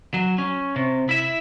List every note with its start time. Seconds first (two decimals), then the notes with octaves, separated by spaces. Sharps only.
0.14 F#3
0.38 C#4
0.76 C3
1.09 E4 E5